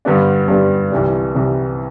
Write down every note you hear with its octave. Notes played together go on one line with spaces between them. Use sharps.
G2 D3 G3 B3 D4
G2 D3 G3 B3 D4
C2 C3 E3 G3
C2 C3 E3 G3